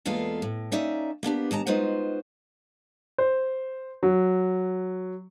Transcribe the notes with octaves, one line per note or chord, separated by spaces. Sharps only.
E2 G#3 A#3 B3 F4 A4
A2
A#3 C#4 D#4 D5 E5
A#3 B3 D4 G4
D#2 G#3 A5 A#5
G#3 D#4 F4 F#4 B4 C5
C5
F#3